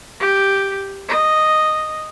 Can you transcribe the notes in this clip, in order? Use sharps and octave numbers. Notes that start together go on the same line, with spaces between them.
G4
D#5